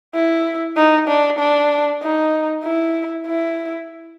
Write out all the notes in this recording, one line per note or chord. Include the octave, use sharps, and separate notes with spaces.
E4
D#4
D4
D4
D#4
E4
E4